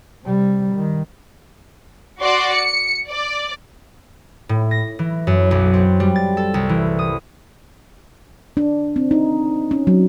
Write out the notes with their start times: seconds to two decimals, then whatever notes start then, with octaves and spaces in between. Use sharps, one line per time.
0.24 C3 G3
0.74 D#3
2.19 F#4 D5 C6
2.53 C#7
3.09 D5
4.49 A2
4.71 A#6
4.99 E3
5.27 F#2
5.51 B1
5.74 C4
6.00 G3
6.16 A6
6.37 A4
6.54 C2
6.69 E3
6.99 D#6
8.57 D4
8.96 C4
9.11 D#4
9.71 C#4
9.87 F#3